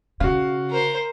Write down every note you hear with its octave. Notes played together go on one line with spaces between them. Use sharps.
C#3 F#4 F5
A#4 C5